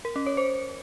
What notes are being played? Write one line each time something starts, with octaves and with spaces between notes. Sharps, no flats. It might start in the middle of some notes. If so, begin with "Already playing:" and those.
A#4
C#4
C#5
C5